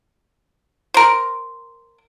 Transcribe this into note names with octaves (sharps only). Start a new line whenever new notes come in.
A#4 C5